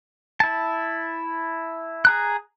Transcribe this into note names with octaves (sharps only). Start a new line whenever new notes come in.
E4 A5
G#4 A#5 F#6